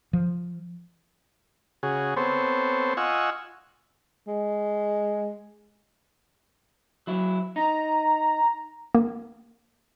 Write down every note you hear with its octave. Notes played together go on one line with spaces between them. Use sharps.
F3
C#3 F#4 G#4
B3 C4 A4 C5 C#5
F4 D#5 F#5 G#5 C#6 E6
G#3
F#3 E4
D#4 A#5
A#3